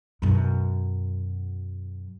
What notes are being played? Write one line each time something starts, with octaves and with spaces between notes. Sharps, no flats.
F#2 B2